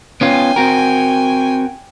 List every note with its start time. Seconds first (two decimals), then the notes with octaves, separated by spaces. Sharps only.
0.21 B3 C#4 F4 G5 G#5
0.56 C4 F#4 A#4